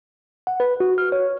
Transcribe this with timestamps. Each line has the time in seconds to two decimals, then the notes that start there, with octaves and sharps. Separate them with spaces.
0.47 F#5
0.60 B4
0.80 F#4
0.98 F6
1.12 C#5